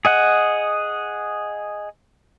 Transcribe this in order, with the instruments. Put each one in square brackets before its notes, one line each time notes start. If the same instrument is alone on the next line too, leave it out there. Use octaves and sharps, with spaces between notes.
[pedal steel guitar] G#4 D#5 F#5